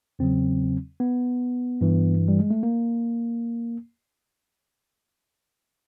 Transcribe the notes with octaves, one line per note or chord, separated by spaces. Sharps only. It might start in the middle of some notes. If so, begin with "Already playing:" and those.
E2 C#3 F#3 C4
B3
G2 E3
G3
G#3
A3
A#3